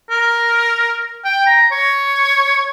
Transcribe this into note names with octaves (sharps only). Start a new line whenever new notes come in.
A#4
G5
A#5
C#5